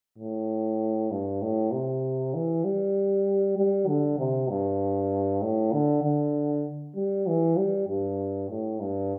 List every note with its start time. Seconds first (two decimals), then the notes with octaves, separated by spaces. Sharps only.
0.18 A2
1.11 G2
1.42 A2
1.72 C3
2.34 E3
2.65 G3
3.57 G3
3.88 D3
4.19 C3
4.49 G2
5.42 A2
5.73 D3
6.03 D3
6.96 G3
7.27 E3
7.57 G3
7.89 G2
8.50 A2
8.81 G2